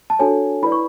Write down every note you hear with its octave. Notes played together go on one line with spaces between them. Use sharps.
A5
D4 F#4 A4 C#5 G#5
E4 B4 D5 B5
C#6